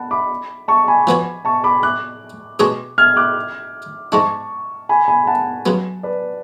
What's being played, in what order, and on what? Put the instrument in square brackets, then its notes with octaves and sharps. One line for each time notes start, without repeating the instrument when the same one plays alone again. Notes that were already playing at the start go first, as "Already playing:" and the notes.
Already playing: [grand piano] F#5 A5 B5
B5 D6
A5 C#6
G#5 B5
[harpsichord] F3 B3 F#4 C#5
[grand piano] A5 C#6
B5 D6
D6 F#6
[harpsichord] B2 G#3 D4 G#4 C#5
[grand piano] F6 G#6
D6 F#6
[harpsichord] G#2 G#3 D4 [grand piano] A5 C#6
[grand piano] G#5 B5
G#5 B5
F#5 A5
[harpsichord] C#3 F#3 B3
[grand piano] B4 D5